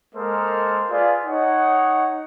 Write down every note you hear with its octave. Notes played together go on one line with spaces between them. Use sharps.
G#3 A#3 A4 A#4 C5 D#5
F4 G#4 B4 D5
D#4 C#5 F#5